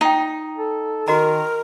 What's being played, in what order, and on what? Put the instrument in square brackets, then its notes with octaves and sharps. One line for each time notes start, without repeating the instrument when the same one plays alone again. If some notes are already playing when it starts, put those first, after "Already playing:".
[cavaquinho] D#4 [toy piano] F4 G5
[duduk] A4
[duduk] D#3 [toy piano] F#4 D#5 A#5 [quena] A#4